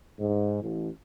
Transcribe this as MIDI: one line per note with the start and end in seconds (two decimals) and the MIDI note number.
0.19 0.58 44
0.62 0.89 33